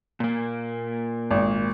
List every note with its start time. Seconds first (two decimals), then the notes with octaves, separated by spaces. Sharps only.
0.20 A#2 A#3
1.31 G#1